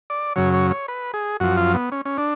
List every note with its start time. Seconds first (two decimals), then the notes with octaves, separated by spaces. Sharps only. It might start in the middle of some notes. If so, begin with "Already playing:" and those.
0.10 D5
0.36 F#2 C#3 F#3 C#5
0.54 C#5
0.71 C#5
0.88 B4
1.13 G#4
1.40 F#2 F3 F#4
1.57 F4
1.74 B3
1.92 C#4
2.05 C#4
2.18 D4